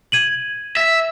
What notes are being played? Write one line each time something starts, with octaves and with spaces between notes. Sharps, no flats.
G#6 D#7 F#7
E5